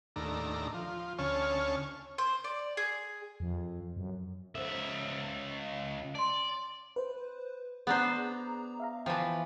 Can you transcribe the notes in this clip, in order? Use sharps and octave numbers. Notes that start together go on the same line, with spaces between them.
D#2 A2 D4 A#5
F3
D2 C#3 C#4 C#5 A5 F6
C5
D5
G#4
F2
F#2
C#2 A4 C5 E5
G5
D5 A5 C6
B4 C5
B3 D4 G#4 C5 A#5
E5 F5 A#5
E3 F3 G5